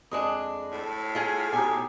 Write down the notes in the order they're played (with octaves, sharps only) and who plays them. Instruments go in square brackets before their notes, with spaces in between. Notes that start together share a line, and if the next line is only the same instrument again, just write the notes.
[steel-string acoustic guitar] F2 G#3 D4 [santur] D#6
[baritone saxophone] A2
[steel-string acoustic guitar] F4 G#4 [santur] F5 G#5
[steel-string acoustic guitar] B2 G#5 [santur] D#4 G4